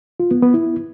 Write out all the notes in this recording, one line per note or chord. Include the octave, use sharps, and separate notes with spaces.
F4
B3
B3
E4